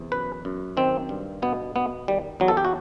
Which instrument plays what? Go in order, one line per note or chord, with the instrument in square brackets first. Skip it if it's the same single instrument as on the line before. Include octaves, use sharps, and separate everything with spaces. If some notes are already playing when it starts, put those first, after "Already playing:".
Already playing: [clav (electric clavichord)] E2 C3
F#2 B4
F#2
D#3 C4
G2
B2 B3
B2 B3
D#3 G3
E2 F#3
A4
G4
F#4